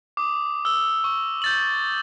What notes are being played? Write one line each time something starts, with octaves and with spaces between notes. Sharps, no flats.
D6 D#6
E6 G7
C#6
G6 A6 F#7